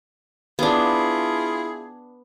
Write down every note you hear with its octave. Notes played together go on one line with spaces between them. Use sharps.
B3 D4 E4 F4 G#4